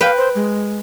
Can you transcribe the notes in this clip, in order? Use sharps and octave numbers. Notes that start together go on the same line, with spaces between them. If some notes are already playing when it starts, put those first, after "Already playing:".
B4 F5 G5
C5
G#3